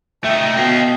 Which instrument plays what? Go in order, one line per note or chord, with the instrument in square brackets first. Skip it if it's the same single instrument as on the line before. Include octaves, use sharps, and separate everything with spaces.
[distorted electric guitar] A3 D#4 [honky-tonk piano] E5 [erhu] G5
[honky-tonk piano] B2 [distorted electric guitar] D#5 F5 [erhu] G5